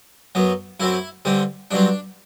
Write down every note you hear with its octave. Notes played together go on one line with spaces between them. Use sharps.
F#2 F#3 B3
F#2 F#3 C4 E4
G2 D3 G3 C4
G2 F#3 C4 D4